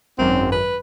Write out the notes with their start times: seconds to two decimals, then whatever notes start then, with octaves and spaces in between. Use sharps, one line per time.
0.18 G#1 F#2 C4
0.52 B4